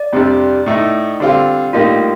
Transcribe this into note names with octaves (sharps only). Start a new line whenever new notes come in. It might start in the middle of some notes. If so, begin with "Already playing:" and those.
Already playing: D5
F2 C3 G3 D4
A2 A3 D#4
D3 G3 C4 F4
A2 G3 A#3 D#4 F4